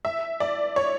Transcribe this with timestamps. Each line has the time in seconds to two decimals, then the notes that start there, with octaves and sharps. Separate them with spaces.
0.05 E5
0.40 D5
0.76 C#5